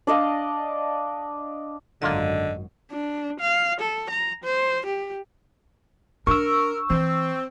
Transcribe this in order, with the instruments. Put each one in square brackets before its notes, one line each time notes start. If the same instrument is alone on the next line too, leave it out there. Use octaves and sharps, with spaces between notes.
[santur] D4 D5 D#5 F5
[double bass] G#1 F#2 [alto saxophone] D3 [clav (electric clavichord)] A#3 F4 A4 [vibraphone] D#5
[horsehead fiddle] D4
F5
A4
A#5
C5
G4
[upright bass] D4 [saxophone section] A#4 [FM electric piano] C#6 E6
[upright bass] E3 [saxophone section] C4